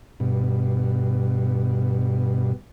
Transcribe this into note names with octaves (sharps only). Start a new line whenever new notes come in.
G2 B2